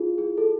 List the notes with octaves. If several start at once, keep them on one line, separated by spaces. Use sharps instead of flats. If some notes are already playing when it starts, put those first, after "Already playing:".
Already playing: E4 F4 G#4
G#4
A4